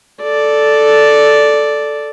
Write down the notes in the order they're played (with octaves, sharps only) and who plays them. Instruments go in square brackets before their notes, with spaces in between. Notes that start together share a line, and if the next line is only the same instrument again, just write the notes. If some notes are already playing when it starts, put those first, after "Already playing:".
[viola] A4 D5